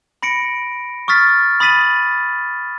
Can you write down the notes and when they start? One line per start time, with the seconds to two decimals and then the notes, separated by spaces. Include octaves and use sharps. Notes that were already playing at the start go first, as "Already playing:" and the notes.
0.23 B5 A#6 C#7 D7
1.08 C#6 D#6 F6 A6 B6
1.60 B5 D#6 A6 B6 D#7 F#7